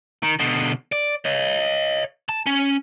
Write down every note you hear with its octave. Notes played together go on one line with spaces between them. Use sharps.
D#3
B2 D3
D5
C#5 D#5
A5
C#4